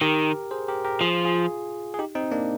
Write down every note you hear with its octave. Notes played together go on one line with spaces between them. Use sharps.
D#3 G4 A#4
G#4 C5
G4 A#4
G4 A#4
F3 F4 G#4
F4 G#4
G#4
D#4 G4
C4 D#4
A#3 D4